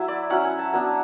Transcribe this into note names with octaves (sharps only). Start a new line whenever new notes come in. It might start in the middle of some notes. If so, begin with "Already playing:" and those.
Already playing: F#3 E4 E5 F#5
D5
F#3 C#4 E4 F#5
G#5
A5
F#3 B3 D4